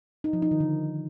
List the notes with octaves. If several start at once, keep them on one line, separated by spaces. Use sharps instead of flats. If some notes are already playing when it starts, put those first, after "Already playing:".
D#4
F3
D#4
D#3
D3